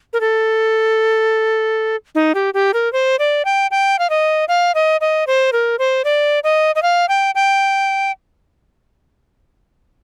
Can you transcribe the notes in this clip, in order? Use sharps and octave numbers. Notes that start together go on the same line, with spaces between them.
A#4
A4
D#4
G4
G4
A#4
C5
D5
G5
G5
F5
D#5
F5
D#5
D#5
C5
A#4
C5
D5
D#5
D#5
F5
G5
G5